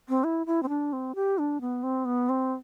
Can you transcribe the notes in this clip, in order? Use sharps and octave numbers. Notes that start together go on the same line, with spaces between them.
C4
E4
E4
C4
D4
C4
G4
D4
B3
C4
B3
C4